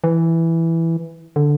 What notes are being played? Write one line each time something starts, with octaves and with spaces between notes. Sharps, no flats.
E3
D3